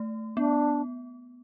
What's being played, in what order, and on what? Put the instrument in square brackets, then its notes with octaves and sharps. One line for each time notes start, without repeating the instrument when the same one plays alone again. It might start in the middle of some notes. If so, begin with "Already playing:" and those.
Already playing: [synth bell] A3
[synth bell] B3 [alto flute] D4